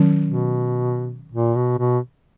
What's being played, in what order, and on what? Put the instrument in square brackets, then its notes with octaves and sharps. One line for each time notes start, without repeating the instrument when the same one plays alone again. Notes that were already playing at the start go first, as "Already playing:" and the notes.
Already playing: [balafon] D#3 F#3 C#4
[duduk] B2
A#2
B2
B2